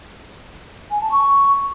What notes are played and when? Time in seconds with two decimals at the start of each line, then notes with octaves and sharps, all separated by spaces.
0.90 G#5
1.01 A5
1.11 C#6